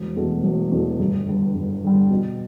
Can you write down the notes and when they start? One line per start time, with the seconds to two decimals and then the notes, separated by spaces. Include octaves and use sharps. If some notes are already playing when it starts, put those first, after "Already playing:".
Already playing: E1
0.16 E2 B2 A3
0.43 E1
0.72 E2 B2 A3
0.99 G1
1.28 G2 D3 G3
1.55 G1
1.83 G2 D3 G3
2.11 B2